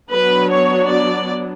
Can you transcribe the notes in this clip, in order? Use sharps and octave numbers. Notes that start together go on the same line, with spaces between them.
F#3 B3 D4 B4
C#5
D5